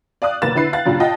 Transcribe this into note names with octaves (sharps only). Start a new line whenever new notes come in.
D5 F5 D#6 F#6
F#1 B1 A#3 B4 A6 E7
D3 E4 B4 C7
F5 F#6 A6
G2 A#2 C#3 F#3
F4 D#5 G5 A5